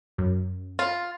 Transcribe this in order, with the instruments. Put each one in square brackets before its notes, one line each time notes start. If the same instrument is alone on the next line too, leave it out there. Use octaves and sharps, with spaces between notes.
[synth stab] F#2
[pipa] F4